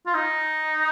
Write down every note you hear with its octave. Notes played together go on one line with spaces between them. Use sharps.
F4
D#4